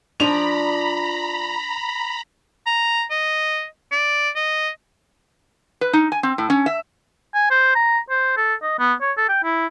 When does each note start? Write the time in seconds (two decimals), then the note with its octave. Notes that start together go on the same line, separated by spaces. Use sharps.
0.20 F3 D4 D5 A#5 B5 F7
2.66 A#5
3.11 D#5
3.92 D5
4.36 D#5
5.81 B4
5.93 D#4
6.12 G#5
6.23 C4
6.38 A2
6.50 C#4
6.66 E5
7.35 G#5
7.51 C5
7.75 A#5
8.10 C5
8.37 A4
8.63 D#5
8.79 B3
9.01 C#5
9.17 A4
9.29 G5
9.44 E4